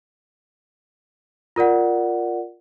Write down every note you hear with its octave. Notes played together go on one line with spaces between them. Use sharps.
F4 A#4 D5 F#5